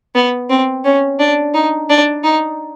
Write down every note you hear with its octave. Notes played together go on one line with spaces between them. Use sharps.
B3
C4
C#4
D4
D#4
D4
D#4